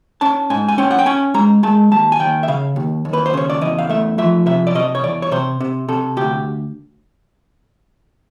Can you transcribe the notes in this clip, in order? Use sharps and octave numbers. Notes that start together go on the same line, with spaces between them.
C#4 A5
G#2 G#5
G#5
C#4 G5
F#5
G5
C#4 G#5
G#3 A#5
G#3 A5
D#2 A5
G#5
D#2 G5
E5
C#3 F5
D#2
D#2
B4
C5
C#3 C#5
D5
E2 D#5
F5
A3 E5
F3 E5
C3 E5
D5
C3 D#5
C#5
E2 D5
C#5
C3 C5
C3
C3 A4
D2 G4